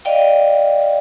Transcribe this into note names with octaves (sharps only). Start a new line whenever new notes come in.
D5 D#5 F5 G5